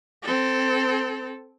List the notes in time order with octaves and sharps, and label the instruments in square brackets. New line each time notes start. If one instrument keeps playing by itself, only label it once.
[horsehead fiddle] C4 A4